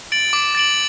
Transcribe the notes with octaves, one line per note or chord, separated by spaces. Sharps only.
A6 D7 F#7
D6
A6 D7 F#7